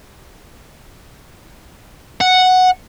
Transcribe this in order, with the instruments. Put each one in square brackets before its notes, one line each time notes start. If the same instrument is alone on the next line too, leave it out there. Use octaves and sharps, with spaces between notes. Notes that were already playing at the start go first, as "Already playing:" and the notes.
[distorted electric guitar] F#5